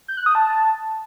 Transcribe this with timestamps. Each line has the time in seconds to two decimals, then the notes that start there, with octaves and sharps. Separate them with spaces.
0.08 G6
0.17 F#6
0.26 D#6
0.35 A5